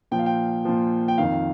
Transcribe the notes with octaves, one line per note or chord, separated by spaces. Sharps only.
A#2 F3 G5
F5
G5
A#2 F3
G5
F2 D#3 F5